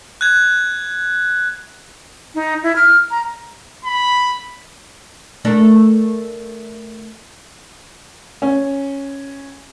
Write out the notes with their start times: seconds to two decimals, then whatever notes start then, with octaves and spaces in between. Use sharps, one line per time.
0.21 F#6 G#6
2.35 D#4
2.63 E4
2.76 F6
3.11 A#5
3.85 B5
5.45 A3 D4 A#4
8.42 C#4